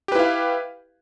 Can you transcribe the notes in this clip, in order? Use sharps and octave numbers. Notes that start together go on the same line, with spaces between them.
E4 G4 B4 F5